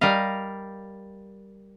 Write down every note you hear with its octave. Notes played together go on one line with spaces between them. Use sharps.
G3 A#4 D#5 F5